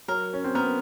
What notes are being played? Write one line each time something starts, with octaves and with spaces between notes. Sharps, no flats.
F#3 A#4
C#4
C4
B3 A#4